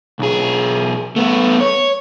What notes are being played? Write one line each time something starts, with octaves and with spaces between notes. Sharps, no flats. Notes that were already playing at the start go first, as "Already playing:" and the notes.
B1 G#4
A3 B3
C#5